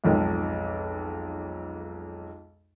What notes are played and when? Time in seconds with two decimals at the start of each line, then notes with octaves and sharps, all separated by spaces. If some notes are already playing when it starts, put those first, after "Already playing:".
0.04 B1 F2 G#2